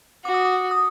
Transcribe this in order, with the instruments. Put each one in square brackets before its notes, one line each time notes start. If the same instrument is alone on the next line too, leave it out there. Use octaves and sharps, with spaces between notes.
[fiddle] F#4 [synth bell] D6
[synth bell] D#6
D6
D#6